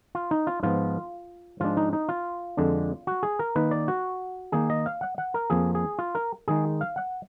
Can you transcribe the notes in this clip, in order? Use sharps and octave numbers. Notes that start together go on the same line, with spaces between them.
F4
D#4
F4
G#2 F3 B3 F4
G#2 F3 G#3 D4 F4
D#4
D#4
F4
F2 D3 G#3 D4
F#4
G#4
A#4
D#3 A#3 D#4 B4
D5
F#4
D#3 A#3 D#4 G#4
D#5
F5
F#5
F#5
A#4
F2 F3 A#3 G#4
G#4
F4
A#4
D#3 G#3 D#4 G#4
F5
F#5